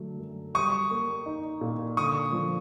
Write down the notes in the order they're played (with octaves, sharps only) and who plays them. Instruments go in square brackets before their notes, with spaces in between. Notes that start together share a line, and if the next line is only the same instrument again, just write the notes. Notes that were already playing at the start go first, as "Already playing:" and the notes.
Already playing: [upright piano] D3 F#3 A3
F#2
[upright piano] G3 [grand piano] C#6 D#6
[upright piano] A#3
D#4
A#2
[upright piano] D3 [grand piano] C#6 D#6
[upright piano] F3